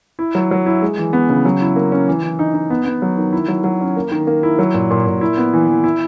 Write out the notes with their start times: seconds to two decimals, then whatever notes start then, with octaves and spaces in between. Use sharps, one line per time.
0.19 E4
0.35 F#3
0.51 F#3
0.66 E4
0.82 G#3
0.98 E3
1.13 B3
1.30 C#3
1.45 F#3
1.61 E4
1.76 A#3
1.92 C#4
2.08 E3
2.23 E3
2.39 D#4
2.54 D#4
2.70 B3
2.86 B3
3.02 F#3
3.18 D#3
3.33 E4
3.48 F#3
3.64 F#3
3.81 C#4
3.96 A#3
4.11 D#3
4.27 A#3
4.43 E4
4.59 F#3
4.74 A#2
4.91 A#2
5.06 A#2
5.21 E4
5.37 B3
5.53 E3
5.68 E3
5.84 E4